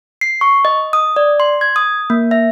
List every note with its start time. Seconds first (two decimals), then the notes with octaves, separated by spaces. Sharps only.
0.21 C7
0.41 C#6
0.65 D#5
0.93 D#6
1.16 D5
1.40 C6
1.61 G#6
1.76 D#6
2.10 A#3
2.31 E5